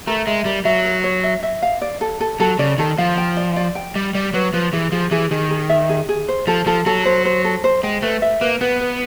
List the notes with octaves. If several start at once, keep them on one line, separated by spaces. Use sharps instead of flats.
A3 A#4
G#3 E5
G3 A#4
F#3 E5
A#4
C#5
E5
E5
F5
D5
A4
A4
F#3 A4
C#3 D5
D#3 A4
F3 F5
G5
D5
D5
G5
G3 D5
G3 D5
F#3 B4
F3 B4
E3 G#4
F3 G#4
E3 G#4
D#3 G#4
G#4
E5
G#4
G#4
C5
F3 A4
F3 A4
F#3 A4
C5
C5
A4
C5
G#3 G5
A3 B4
E5
A#3 B4
B3 B4
B4